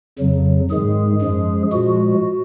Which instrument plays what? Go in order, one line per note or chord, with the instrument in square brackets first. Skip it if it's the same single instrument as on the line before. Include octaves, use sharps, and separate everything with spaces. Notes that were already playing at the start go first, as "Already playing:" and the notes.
[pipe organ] F2 C#3 F#3
G#2 D#3 G#3 G#4
F#2 F3 G#3
A#2 F3 G#3 F#4